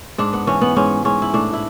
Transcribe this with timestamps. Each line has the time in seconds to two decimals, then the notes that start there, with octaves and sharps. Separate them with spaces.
0.18 G#2 D4
0.33 B3
0.47 E3 C#4
0.61 B3
0.76 G#2 C#4
1.05 G#2 C#4
1.22 E4
1.33 A2 D4
1.53 E4